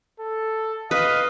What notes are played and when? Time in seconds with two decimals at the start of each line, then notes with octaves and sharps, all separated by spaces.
0.20 A4
0.91 B4 D#5 F5